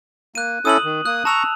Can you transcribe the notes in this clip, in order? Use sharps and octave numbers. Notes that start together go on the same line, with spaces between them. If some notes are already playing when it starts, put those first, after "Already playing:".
A#3 F#6 D#7
C#4 E4 A4 D#6 D#7 F#7
D#3
A#3 D#6 F#6
A5 A#5 C#6 E6 F7